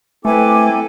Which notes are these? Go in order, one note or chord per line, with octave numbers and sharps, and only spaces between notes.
A3 C4 E4 A4 B4 G#5 D6